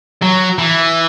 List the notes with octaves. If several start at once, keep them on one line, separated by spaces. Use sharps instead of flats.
F#3
E3